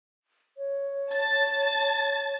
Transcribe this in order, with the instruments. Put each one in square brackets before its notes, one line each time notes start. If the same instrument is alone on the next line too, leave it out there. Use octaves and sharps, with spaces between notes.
[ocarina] C#5
[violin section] A5 A6